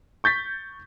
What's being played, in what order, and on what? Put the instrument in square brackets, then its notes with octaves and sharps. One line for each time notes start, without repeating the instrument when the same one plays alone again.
[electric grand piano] C#6 G6 A6 B6